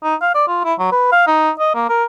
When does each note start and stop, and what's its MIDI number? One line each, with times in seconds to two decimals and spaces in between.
0.03 0.15 63
0.21 0.33 77
0.35 0.44 74
0.47 0.62 65
0.64 0.74 64
0.79 0.90 54
0.92 1.11 71
1.12 1.23 77
1.27 1.50 63
1.59 1.73 75
1.74 1.87 58
1.89 2.04 70